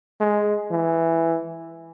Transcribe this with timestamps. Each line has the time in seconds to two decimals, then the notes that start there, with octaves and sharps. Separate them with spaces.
0.20 G#3
0.71 E3